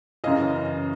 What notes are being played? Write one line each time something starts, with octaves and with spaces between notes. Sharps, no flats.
F#2 C#3 E3 D#5 F5